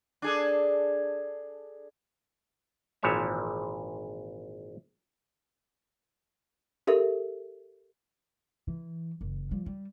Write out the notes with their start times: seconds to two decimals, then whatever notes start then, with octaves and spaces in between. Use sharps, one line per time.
0.22 D4 G#4 A4
3.03 G#1 A#2 E3 F3 C#5 E5
6.87 G4 A4 A#4 E5
8.68 E3
9.21 F#1
9.51 F3 G3
9.66 G3